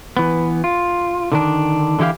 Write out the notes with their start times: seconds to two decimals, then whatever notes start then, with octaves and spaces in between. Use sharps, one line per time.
0.17 E3 B3
0.64 F4
1.32 D3 D#3 D4
1.99 D3 E3 E4 G4 F5